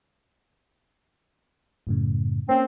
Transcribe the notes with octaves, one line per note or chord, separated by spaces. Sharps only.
F#2 A2 C#3
A#3 C4 C#4